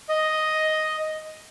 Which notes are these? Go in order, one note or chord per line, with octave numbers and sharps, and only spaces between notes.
D#5